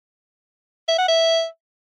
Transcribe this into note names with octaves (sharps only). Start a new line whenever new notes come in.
E5
F#5
E5